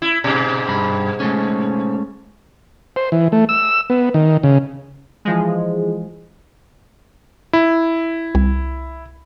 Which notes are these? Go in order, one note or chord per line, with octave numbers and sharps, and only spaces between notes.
E4
G#2 B2
G2 B5
G#3 A3 C#4
C5
E3
A3
E6
B3
D#3
C#3
E3 F3 G#3
E4
C2